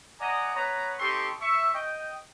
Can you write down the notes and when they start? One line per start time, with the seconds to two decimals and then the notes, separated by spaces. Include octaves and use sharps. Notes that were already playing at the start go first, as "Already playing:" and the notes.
0.20 D5 D#5 F#5 G#5 A#5
0.55 B3 B4 C#5 A#5
0.99 C4 D#4 G4 A4 C6 C#6
1.42 E5 C#6
1.74 D#5 G5